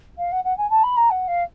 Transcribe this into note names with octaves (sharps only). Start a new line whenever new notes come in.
F5
F#5
F#5
G#5
A5
B5
A#5
F#5
F5